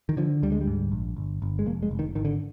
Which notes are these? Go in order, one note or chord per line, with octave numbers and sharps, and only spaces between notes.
D#3
D3 F3
D2 G3
G#3
G3
G#2
A#1
G1
G1
G#3
F1 A#3
G#3
F1
D#3
G#1 D#3
D3